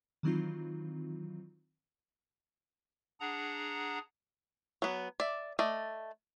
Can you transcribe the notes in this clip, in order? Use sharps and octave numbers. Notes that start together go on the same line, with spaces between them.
D#3 E3 F#3 C4 D#4 F4
D4 G#4 F#5 A#5
F#3 B3
D5 E5
A3 D5 D#5